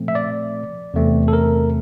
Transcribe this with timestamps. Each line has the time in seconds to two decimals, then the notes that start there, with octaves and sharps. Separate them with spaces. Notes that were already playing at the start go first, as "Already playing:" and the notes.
Already playing: A#2 F3 A3 C4
0.08 E5
0.15 D5
0.94 E2 C3 E3 A3 C4
1.28 A4
1.33 A#4